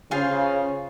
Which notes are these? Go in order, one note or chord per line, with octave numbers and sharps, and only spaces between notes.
C#3 F4 G#4 C5 F5